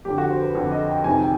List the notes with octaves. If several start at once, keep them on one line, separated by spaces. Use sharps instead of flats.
F2 D3 G4
F#4
C5
B4
F2 D3
D#5
G5
F2 C3 D#3 G#5
G5